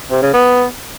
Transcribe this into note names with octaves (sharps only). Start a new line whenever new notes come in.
C3
C#3
B3